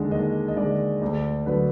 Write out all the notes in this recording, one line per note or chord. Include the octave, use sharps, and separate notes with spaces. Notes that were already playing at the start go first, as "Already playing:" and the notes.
Already playing: D#2 D3 G#3
D#2 D#5
D#5
D3 G#3 D5
D2 D5
D3 F#3 B4